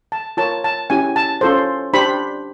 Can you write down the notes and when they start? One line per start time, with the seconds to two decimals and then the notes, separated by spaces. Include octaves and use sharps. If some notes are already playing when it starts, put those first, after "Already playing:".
0.12 A5
0.37 F4 A#4 C#5 A5
0.64 A5
0.90 C#4 E4 G4 G#5
1.16 A5
1.41 C#4 F4 A4 C5
1.93 D4 G4 C5 B5